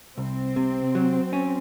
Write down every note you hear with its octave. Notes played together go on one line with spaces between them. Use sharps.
C2 C4
C3
F#3
C#4